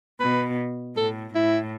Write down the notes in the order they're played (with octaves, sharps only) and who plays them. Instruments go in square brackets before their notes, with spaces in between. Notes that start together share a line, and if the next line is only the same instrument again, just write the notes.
[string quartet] B2 [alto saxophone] B4
[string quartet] A2 [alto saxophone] A4
[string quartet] A2 [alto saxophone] E4